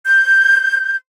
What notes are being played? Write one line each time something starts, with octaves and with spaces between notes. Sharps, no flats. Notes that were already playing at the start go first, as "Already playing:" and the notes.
G6